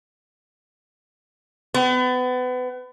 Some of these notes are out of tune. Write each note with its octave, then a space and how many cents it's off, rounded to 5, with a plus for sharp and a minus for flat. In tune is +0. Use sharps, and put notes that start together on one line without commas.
B3 +30